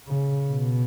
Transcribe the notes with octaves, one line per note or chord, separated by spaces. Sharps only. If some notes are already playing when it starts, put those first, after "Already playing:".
C#3
B2